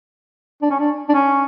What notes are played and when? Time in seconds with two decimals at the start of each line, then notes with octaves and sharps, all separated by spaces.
0.62 D4
0.71 C#4
0.80 D4
1.09 D4
1.14 C#4